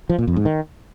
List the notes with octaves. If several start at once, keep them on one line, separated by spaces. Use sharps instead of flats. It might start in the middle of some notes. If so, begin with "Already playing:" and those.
F3
A#2
F2
G#2
D#3